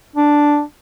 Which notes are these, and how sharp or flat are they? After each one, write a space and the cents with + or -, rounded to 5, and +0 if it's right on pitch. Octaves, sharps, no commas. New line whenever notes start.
D4 +0